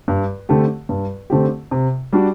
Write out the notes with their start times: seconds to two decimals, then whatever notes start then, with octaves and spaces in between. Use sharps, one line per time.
0.08 G2
0.49 D3 A3 C4 G4
0.89 G2
1.30 D3 A3 C4 G4
1.71 C3
2.13 G3 D4 F#4